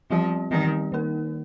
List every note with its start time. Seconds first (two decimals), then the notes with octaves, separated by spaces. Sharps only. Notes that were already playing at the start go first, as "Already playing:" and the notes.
0.10 F3 G3 C4 G4 D5
0.51 D#3 G3 C4 G4 D5
0.92 D#3 A#3 D#4 A#4